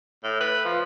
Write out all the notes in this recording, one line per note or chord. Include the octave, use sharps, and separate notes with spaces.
A2
B4
F3